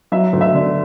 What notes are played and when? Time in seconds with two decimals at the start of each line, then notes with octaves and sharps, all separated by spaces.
0.12 F#3 E5
0.33 D2
0.41 E5
0.55 D3